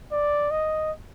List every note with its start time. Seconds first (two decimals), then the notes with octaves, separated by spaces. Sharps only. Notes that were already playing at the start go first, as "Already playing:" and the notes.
0.12 D5
0.51 D#5